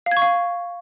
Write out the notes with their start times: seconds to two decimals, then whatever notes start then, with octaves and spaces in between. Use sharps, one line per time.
0.06 F5
0.11 G#6
0.17 C#6
0.22 F5